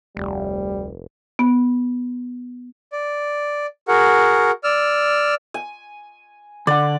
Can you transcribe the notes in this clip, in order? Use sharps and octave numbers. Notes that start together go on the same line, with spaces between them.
F1 D2 G3
B3
D5
F#4 G#4 A#4 F#5
D5 E6 F6
G#5
D3 D5 F#5